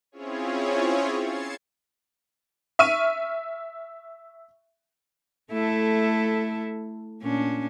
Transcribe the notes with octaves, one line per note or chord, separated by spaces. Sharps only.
C4 C#4 E4 F4 G#4 C#5
G#6 A6 C7 C#7 E7
E5 C#6 F6 D#7
A3 E4 A4
A#2 C#4 D4